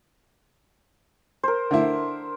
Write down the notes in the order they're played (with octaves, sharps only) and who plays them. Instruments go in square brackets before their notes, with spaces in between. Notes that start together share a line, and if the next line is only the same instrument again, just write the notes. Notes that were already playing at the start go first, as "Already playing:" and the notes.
[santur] A#4 C5
[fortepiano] D3 E4